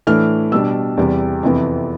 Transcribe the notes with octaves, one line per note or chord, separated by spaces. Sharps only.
A2 E3 A3 D4 F6
B2 G3 D4 E6
E2 C3 G3
F2 C3 E3 B3